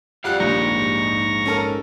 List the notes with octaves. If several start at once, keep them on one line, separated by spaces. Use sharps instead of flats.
F2 G3 F5 F#5 F#6
A#1 D#2 G#3 D#4 A#5 C#6 A#6
C#4 A4 A#4